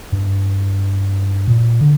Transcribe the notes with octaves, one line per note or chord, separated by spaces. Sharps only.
G2
A#2
D3